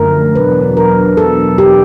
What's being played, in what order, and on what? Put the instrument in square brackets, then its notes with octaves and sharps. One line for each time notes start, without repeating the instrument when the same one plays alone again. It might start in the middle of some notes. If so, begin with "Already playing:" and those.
Already playing: [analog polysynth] F#2 D3 F3 A3 [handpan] A#4
[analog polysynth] E2 B2 F#3 B3 D4 [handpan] B4
[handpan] A#4
A4
G4